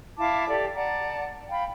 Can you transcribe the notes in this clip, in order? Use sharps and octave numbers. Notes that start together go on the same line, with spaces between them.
E4 F5 A5 D6
G4 A4 D5
D5 F#5 A5 A#5
F5 G5 B5